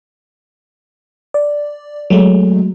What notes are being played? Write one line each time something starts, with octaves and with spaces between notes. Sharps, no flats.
D5
F#3 G#3 A3